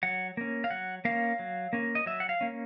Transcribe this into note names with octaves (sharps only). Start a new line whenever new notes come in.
F#3 F#5
A#3 C#4
F5
F#3 F#5
A#3 C#4 F5
F#3
A#3 C#4
D#5
F#3 E5
F#5
F5
A#3 C#4